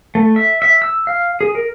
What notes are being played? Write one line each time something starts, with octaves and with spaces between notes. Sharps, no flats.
A3
E5
E5
E6
F5
G#4
A#4